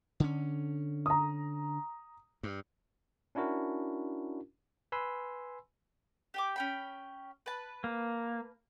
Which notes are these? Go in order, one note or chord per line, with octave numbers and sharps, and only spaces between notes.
D3 C#4
A#5 D#6
G2
C#4 D4 E4 F#4 A#4
B4 G#5 B5 C6 E6
G4 G5 D6
C#4 G5 B5
B4 A5
A#3